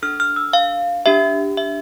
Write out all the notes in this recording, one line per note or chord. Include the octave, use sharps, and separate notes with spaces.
D4 A4 F6
F6
E6
F5
D4 G4 E5
E5